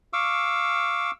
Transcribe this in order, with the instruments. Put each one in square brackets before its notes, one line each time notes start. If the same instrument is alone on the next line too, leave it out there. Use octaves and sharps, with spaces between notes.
[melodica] F5 C#6 D6 E6